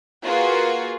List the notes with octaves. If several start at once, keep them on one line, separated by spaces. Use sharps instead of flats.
A#3 F4 F#4 G#4 B4